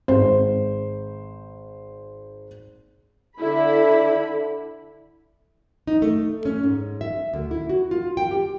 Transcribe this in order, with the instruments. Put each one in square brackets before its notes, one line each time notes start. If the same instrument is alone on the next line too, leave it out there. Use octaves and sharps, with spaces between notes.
[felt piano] G#1 C5
[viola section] D3 E4 B5
[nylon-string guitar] D#4
A3
C#4
G#2
E5
D2
E4
F#4
F4
G5
G4